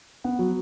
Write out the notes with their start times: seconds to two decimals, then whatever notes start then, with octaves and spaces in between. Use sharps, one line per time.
0.24 B3 F#5
0.39 F#3